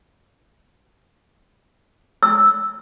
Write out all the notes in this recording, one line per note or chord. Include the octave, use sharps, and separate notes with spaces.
E6